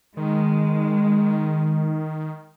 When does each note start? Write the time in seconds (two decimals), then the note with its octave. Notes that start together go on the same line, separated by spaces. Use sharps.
0.17 D#3 G#3